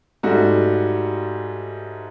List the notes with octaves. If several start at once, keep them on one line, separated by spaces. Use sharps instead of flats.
G#2 G3 A3 F#4